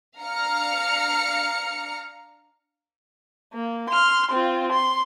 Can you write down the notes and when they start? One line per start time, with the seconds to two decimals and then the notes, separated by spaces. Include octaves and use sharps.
0.20 D4 F5 A#5 F6 C#7
3.54 A#3
3.90 C6 F6
4.32 C4 F4
4.72 C6